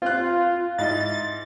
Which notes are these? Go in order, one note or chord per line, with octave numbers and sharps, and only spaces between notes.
C4 F4 F#6
G#2 E4 D#5 A6